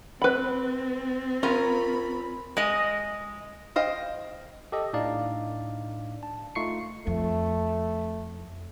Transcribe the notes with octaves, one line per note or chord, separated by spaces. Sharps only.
C4 B4 B5
C#4 F4 A#4 B5
G#3 D#5
C5 D#5 F5 G5
G4 A4 D#5
A2 D4 D#4 D5 F5
A5
A3 D#4 F4 C#6 C7 C#7
F2 A3